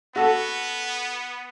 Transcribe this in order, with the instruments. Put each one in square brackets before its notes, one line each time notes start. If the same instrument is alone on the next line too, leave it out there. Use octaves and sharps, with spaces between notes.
[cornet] B3 [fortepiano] F#4 A4